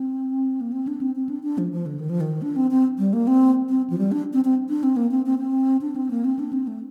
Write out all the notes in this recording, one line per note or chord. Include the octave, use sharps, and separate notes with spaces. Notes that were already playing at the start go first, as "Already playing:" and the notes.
Already playing: C4
A#3
C4
D4
C4
C4
D4
D4
F3
F3
D3
D#3
F3
D#3
D4
C4
C4
G3
A#3
C4
C4
F3
G3
D4
C4
C4
D4
C4
A#3
C4
C4
C4
D4
C4
A#3
C4
D4
C4
A3